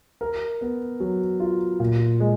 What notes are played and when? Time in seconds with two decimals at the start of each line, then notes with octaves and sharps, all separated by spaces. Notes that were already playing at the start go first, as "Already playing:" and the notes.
0.21 A#4
0.61 B3
1.00 F#3
1.40 F4
1.80 A#2
2.20 G#3